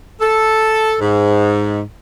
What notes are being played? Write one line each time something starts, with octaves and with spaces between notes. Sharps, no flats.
A4
G#2